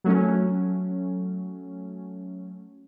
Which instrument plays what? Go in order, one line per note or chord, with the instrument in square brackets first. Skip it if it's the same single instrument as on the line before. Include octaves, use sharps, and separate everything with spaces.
[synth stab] F#3 A3 C#4